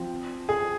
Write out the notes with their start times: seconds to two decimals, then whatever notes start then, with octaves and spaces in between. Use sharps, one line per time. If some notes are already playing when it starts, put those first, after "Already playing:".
Already playing: F3 C4
0.49 G#4